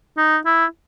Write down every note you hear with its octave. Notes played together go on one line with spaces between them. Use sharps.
D#4
E4